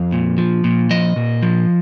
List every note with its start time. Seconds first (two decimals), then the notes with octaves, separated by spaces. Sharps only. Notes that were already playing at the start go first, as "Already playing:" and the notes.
Already playing: F2 F5
0.12 A#2
0.38 F3
0.64 A#2
0.90 F3 D#5
1.16 A#2
1.42 F3